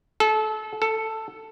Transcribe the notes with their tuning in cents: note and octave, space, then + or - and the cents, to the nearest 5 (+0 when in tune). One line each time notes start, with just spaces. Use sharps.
A4 -30
A4 +5